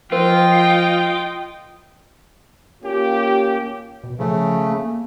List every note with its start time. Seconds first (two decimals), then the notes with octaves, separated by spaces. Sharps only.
0.12 F3 F4 A#4 C5 D#5 G5
2.82 A#3 C#4 F4 G4
4.04 B2
4.19 C#3 F3 A3
4.71 A#3